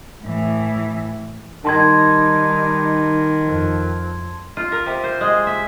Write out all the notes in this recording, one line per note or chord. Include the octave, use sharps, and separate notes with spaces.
A2 E3
D#3 G3 D#4 A5 C6 G#6
F2
F4
A#4
C3
C5
G#3
E5